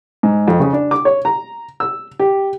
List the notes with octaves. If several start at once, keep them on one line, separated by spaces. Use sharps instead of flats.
G#2
F2
C#3
D4
D6
C#5
A#5
E6
G4